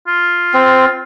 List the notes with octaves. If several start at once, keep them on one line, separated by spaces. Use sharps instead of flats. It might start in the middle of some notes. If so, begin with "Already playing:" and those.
F4
C4